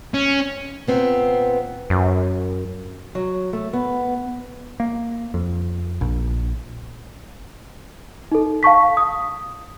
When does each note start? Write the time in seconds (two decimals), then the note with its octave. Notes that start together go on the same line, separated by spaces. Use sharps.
0.14 C#4
0.88 A#2 B3 C4
1.90 F#2
3.15 F#3
3.53 A3
3.73 B3
4.80 A#3
5.34 F2
6.01 A#1
8.32 D#4 A4
8.63 F5 A5 C#6 B6
8.97 D#6